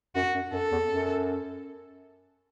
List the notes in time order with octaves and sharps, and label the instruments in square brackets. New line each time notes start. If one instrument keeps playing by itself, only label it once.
[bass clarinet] F#2 [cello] F#4
[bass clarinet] F#2
[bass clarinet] F#2 [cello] A4
[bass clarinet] E2
F#2